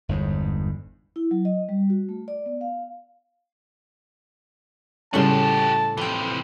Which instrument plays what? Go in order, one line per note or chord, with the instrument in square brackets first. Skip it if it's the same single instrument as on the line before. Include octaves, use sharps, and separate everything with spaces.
[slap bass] G1 E2 G#2
[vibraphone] E4
F#3
D#5
G3
F#4
A3
D5
B3
F5
[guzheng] A2 C6 [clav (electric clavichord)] C#3 G3 C#4 [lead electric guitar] F#4 G4 [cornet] A5
[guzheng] F2 G5 [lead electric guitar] C3 E3